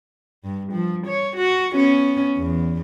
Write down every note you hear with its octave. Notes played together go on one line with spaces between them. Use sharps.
G2
F3
C#5
F#4
B3 C#4
E2